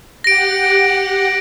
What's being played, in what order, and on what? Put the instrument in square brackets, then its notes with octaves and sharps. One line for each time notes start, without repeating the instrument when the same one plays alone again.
[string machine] G4 F#5 [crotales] A#6 D7